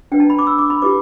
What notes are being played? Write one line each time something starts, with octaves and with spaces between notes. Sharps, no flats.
D4 B4 G5
A5
B5
D6
E6
D6
B5
E4 G4 B4 D6